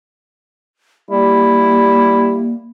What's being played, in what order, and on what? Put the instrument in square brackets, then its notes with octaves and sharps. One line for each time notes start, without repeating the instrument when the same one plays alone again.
[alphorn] G3 [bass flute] A#3 [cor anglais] E4